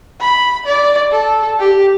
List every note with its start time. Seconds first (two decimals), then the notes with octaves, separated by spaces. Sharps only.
0.20 B5
0.66 D5
1.12 A4
1.59 G4